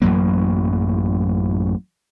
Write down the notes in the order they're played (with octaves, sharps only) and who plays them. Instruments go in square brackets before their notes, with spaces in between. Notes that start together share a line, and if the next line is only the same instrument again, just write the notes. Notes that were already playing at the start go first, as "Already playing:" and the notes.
[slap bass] A1 F#2 F#3 A#3